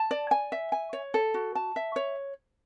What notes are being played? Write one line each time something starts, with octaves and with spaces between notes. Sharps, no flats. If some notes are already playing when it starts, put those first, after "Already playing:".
Already playing: A5
D5
G#5
E5
G#5
C#5
A4
F#4
A5
E5
C#5